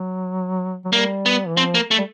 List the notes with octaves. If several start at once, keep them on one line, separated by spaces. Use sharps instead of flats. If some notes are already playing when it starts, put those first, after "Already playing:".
Already playing: F#3
F#3
G3 A#3
B3
E3
F3 C4
A#3
A3
G3